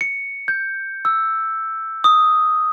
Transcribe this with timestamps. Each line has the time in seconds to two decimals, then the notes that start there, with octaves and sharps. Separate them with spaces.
0.01 C#7
0.48 G6
1.05 E6
2.04 D#6